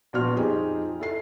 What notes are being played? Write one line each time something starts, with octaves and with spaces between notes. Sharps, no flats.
A#1 B3 F#4 C6 F6
F2 D#4 G4 G#4
E4 A4 C7